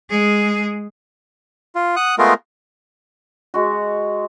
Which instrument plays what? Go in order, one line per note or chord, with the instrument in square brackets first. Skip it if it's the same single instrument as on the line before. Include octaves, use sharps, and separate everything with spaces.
[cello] G#3 G#4
[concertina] F4
F#5 D#6 F#6
G#3 A3 B3 F4 A#4
[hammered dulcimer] G#3 F#4